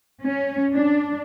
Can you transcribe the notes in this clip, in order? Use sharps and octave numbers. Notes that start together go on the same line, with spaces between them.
C#4
D4